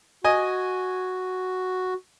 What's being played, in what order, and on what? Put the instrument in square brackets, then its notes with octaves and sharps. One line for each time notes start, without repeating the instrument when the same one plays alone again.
[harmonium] F#4 [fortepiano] D#5 G#5